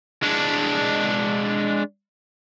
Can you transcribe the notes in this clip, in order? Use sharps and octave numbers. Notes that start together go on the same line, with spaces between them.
G#3 D4